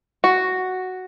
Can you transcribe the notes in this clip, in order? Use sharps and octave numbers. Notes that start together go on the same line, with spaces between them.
F#4